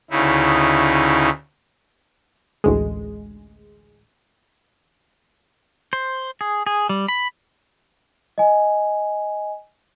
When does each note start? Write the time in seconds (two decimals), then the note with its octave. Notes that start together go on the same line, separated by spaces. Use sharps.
0.10 D2 C#3 D#4 E4
2.64 A1 D2 G#3
5.93 C5
6.41 G#4
6.67 G#4
6.89 G3
7.08 B5
8.38 D#5 G#5